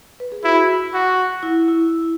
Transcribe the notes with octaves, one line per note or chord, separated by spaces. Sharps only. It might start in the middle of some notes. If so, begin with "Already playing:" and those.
B4
G#4
E4 F#4
F#4
E4
E4